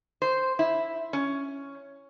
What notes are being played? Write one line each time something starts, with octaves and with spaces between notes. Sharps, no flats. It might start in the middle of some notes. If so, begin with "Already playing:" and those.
C5
E4
C#4